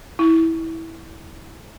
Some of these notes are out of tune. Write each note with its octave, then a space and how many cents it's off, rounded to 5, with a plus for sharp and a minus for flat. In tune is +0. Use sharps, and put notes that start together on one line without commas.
E4 -20